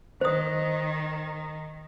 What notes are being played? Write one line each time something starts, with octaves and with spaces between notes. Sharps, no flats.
D#3 C5 D#6